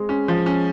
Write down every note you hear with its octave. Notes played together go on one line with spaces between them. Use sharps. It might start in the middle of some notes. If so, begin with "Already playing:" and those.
Already playing: G#3 C4
C#4
F3
C#4